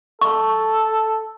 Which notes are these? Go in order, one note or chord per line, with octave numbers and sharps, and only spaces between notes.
A4 C#6